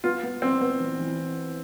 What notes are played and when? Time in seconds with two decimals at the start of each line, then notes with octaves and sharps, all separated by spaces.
0.04 B3 F4
0.23 B3
0.42 B3 C4
0.61 B3
0.80 E3
0.99 E3